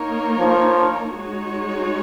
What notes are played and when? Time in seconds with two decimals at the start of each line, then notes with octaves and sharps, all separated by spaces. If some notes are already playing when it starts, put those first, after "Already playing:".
Already playing: A#3 D#4 A#4 C#5
0.39 F3
1.17 G#3 D#4 F#4 C#5